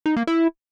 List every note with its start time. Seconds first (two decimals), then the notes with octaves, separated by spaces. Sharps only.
0.06 D#4
0.17 A#3
0.27 E4